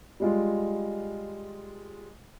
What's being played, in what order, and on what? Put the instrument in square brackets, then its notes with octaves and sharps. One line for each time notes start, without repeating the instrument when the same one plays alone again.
[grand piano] G3 G#3 F4